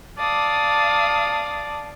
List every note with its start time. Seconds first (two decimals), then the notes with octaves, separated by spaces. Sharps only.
0.18 D5 F5 A5 D#6